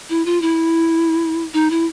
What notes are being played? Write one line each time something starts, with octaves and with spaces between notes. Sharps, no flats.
E4
F4
E4
D#4
E4